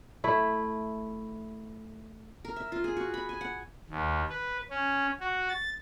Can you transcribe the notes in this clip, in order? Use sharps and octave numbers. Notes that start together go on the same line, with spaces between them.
A3 E4
A#4
E5
F4
G#4
F#4
B5
G#5
F#5
D#2
B4
C#4
F#4
A6